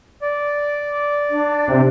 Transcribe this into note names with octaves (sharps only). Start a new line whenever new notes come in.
D5
D4
C3